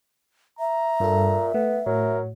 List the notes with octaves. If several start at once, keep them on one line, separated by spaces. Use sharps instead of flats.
E5 A#5
G2 A#2 A4
A3 B3
A2 F#3 A#4